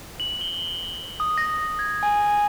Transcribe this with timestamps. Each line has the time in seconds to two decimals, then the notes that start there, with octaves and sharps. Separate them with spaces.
0.20 F#7
0.41 G7
1.20 D#6
1.38 A#6
1.79 G#6
2.03 G#5